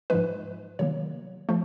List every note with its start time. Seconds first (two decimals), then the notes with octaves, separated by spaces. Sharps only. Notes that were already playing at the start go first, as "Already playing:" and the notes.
0.10 G#2 F3 G#3 B4
0.79 C3 D#3 F#3 A#3 C#5
1.49 F3 A3